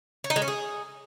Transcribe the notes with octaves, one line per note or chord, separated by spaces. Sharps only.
C#5
D#4
G#3
C#4
G#4